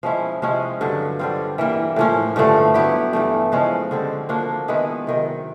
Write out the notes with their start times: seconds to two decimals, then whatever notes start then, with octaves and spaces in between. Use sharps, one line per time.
0.03 F3 G#3 C#4 E4
0.42 C3 F3 G#3 C#4
0.81 G2 D3 F#3
1.19 D3 G3 C4 F4
1.58 E3 G3 A#3
1.96 A2 F3 A#3 C#4
2.36 G2 D3 F3 A3
2.74 F#3 B3 E4 G4
3.13 G2 E3 A3
3.52 C#3 F3 G#3 C#4
3.91 D3 G3 C4
4.29 F3 A#3 D4 F#4
4.68 D#3 G#3 B3 E4
5.07 C3 D#3 F#3